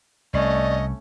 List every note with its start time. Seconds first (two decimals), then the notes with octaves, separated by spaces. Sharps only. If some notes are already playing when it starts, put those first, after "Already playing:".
0.34 C2 A3 C#4 D5 D#5